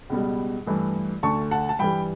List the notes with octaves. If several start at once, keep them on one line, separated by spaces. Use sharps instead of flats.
C#2 B2 G3
G2 E3 A3
D2 D3 A3 A5 C#6
F#5 A5
A5
G2 E3 G3 G5 B5